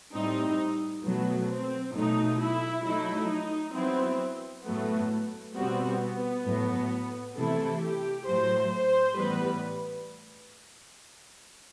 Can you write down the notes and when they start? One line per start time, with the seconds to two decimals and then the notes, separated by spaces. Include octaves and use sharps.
0.13 A2 G3 C4 D#4
1.03 B2 F#3 A3 B3
1.49 C4
1.94 B2 F#3 A3 D#4
2.39 E4
2.84 F#3 A3 D#4 E4
3.29 D#4
3.74 F#3 B3 C4 E4
4.64 A2 F#3 A3 B3
5.54 B2 G3 B3 C4 F#4
6.00 B3
6.45 A2 F#3 A3
7.36 C3 E3 A3 E4 A4
7.81 G4
8.26 A2 F#3 A3 C5
8.70 C5
9.16 A2 E3 G3 B3 B4